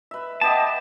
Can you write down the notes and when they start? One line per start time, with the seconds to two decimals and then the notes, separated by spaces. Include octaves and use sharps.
0.11 B4 E5
0.41 B3 G4 D#5 A5